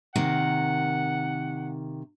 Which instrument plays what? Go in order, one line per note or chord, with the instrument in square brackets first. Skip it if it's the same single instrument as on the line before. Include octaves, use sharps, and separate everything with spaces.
[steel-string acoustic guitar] C3 D#3 A#3 [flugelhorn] F#5